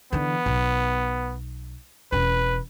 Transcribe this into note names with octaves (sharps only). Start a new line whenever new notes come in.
D3 E3 B3
B1
E1 C#4 B4